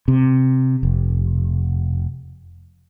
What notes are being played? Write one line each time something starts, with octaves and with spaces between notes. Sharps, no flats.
C3
F1